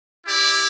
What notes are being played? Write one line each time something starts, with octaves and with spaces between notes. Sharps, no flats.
E4 G4 D5